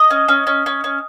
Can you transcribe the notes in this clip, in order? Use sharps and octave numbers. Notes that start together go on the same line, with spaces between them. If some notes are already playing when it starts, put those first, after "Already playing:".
Already playing: D#5
C#4
C#4
C#4
C#4
C#4